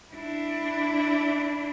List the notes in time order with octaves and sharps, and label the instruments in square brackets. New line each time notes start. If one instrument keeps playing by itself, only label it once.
[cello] D4 E4